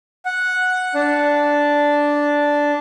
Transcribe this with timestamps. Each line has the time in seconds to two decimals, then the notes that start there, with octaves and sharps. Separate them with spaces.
0.25 F#5
0.95 D4